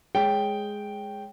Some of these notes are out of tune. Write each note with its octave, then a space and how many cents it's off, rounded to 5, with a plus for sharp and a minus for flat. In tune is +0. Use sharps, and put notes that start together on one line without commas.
G#3 +0 C#5 +0 G5 -5